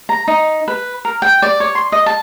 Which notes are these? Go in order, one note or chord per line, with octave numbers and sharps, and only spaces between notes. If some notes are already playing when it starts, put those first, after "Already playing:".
A#5
D#4
B4
A#4
G5
D5
C#5
C6
D#5
A5